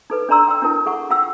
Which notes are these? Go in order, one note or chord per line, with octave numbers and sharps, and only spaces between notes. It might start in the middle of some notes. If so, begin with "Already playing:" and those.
D#4 A4 B4
D4 A4 D5 A#5 C6 E6
G5 E6
D4 E4 A#4 A5
G#4 A4 F#5 C#6
F4 F#5 G5 E6